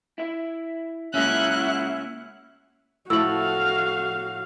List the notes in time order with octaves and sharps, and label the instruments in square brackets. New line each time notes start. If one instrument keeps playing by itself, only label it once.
[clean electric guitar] E4 E5
[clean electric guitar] C#3 G#3 [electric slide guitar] A#3 C#4 [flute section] E4 F#4 [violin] F#6
[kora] A2 F3 A3 [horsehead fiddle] F#4 F5 [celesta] E6 F#7